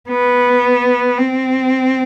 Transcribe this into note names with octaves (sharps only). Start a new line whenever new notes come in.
B3
C4